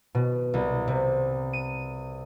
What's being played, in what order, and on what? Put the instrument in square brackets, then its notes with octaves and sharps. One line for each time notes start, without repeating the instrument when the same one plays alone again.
[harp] B2
C2
C3
D#7